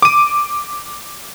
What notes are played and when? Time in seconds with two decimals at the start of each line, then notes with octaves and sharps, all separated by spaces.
0.02 D6 D#7